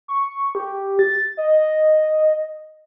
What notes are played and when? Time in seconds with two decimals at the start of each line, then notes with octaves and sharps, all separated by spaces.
0.08 C#6
0.55 G4
0.99 A6
1.37 D#5